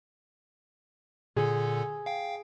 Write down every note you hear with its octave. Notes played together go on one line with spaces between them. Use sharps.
A#2 D3 G#4 A4
F5 G5